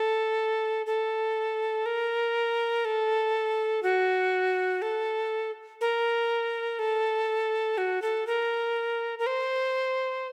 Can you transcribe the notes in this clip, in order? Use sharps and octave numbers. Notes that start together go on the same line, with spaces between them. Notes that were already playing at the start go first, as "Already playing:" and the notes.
Already playing: A4
A4
A#4
A4
F#4
A4
A#4
A4
F#4
A4
A#4
A#4
C5